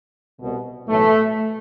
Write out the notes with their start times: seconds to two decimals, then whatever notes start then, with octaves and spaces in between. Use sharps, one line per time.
0.40 C2 B2
0.88 B1 A2 E3 A3